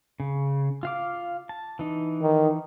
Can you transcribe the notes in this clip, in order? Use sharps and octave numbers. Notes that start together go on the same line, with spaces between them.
C#3
F4 F5 D6
A5
E3 D#4
D#3